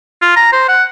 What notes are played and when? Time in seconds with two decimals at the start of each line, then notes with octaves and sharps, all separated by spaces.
0.22 F4
0.36 A#5
0.53 C5
0.68 F#5